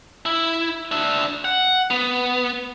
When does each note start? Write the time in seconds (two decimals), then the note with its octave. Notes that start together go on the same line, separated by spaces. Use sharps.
0.25 E4
0.92 D4 E5
1.45 F#5
1.90 B3